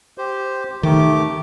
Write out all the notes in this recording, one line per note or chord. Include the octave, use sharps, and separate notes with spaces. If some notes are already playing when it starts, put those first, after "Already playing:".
G4 C5
D#3 A3 G4 D6